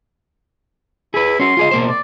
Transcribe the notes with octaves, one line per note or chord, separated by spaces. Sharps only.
E4 G#4 B4
C#4 F#4 C6
F4 G#4 D#5
B2 A#3 C5
D5